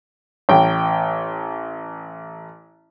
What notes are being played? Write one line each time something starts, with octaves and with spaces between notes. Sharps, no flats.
A1 G5